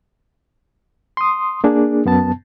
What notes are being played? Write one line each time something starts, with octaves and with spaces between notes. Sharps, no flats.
C6 D#6
A#3 D4 G#4
F#2 B3 A5